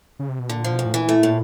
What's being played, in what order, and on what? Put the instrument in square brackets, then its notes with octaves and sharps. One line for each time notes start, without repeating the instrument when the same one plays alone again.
[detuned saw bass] C#3
C3
B2
[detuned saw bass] A#2 [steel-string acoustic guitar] D3
[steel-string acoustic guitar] F3
[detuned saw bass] B2
[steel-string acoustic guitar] D2
[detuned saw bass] A2
[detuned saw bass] A#2 [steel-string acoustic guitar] E3
[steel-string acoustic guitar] A3
A2